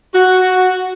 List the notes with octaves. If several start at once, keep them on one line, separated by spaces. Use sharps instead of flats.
F#4